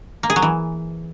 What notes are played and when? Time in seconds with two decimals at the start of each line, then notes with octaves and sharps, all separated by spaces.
0.23 A#3
0.30 G#4
0.36 F#3
0.42 E3